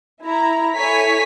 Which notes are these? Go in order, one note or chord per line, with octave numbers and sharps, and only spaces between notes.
E4 A#5
E4 A4 C#5 G#5 B6